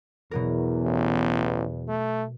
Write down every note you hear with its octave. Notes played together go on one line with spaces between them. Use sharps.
E2 B2 F#3 A#4
A1
A3